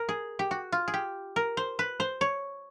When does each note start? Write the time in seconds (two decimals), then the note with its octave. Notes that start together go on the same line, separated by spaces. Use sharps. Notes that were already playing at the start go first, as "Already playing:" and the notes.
Already playing: A#4
0.09 G#4
0.39 G4
0.51 F#4
0.72 F4
0.88 G#4
0.94 G4
1.36 A#4
1.57 C5
1.79 B4
2.00 C5
2.21 C#5